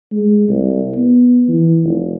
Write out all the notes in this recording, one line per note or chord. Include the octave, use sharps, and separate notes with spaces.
G#3
C2
B3
E3
F1